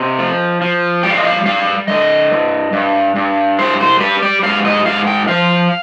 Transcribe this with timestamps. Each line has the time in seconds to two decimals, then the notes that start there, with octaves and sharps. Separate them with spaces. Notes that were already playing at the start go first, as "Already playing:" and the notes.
Already playing: C3 D#5
0.19 F3
0.62 F3
1.03 G3 G5
1.10 F5
1.18 D#5
1.25 F5
1.46 G3 F5
1.88 D3 D#5
2.31 G2
2.73 G2
3.16 G2
3.59 G3 C5
3.80 C5
4.00 G3 B4
4.22 D5
4.43 G#2 F5
4.65 D#5
4.86 G#2 F5
5.07 G5
5.28 F3 F5